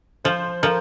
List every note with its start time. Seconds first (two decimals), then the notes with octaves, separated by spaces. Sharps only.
0.24 F3 C5
0.63 F3 A#4